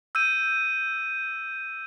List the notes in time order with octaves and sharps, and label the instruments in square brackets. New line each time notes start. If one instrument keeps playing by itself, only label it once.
[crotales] E6 G6 D#7